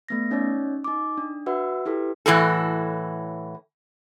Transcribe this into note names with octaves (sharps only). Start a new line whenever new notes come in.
A3 B3 A#6
C#4 D#4 C#5 D5
D#4 D6
D4
F#4 B4 E5 F#5 E6
E4 G4 A4 B4
A2 E3 F#4 A4